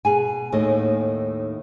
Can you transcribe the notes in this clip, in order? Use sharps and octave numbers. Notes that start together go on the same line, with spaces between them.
B2 G#4 G#5
D#2 A2 D#3 D#5